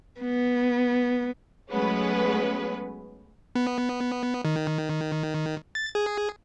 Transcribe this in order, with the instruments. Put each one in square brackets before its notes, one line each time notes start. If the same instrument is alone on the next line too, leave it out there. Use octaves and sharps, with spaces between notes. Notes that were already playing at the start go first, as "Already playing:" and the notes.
[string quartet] B3
[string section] F#3 G#3 A3 B3 C#4 B4
[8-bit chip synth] B3
D#3
A6
G#4